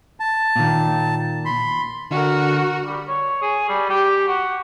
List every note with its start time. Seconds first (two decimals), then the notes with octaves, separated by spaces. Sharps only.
0.20 A5
0.56 A#2 D#3
1.45 B5 C6
2.11 D3 F#4 A#4
2.84 G3
3.08 C#5
3.42 G#4
3.69 G3
3.90 G4
4.27 F#4